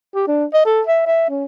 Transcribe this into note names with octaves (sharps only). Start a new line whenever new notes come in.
G4
D4
D#5
A4
E5
E5
C#4